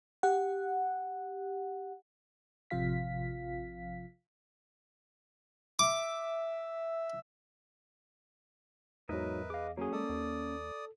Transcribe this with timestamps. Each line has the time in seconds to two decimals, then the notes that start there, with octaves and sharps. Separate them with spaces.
0.23 G4 F#5
2.70 A1 C3 F3 F4 F5 B6
5.79 E5 D6
9.09 E2 G#2 F#3 A#4 B4 D#5 E5
9.50 G#4 D#5 F5 D6
9.77 D3 F#3 A#3 C#4 G#4
9.93 G#3 A4 D5 D#6
10.09 D#2